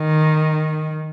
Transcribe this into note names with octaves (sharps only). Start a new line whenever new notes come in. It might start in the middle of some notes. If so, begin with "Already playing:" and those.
Already playing: D#3